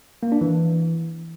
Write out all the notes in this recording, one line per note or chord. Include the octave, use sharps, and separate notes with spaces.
A#3
D4
E3